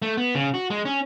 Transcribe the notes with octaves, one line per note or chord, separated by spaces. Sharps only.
A3
B3
C#3
F#4
G#3
C#4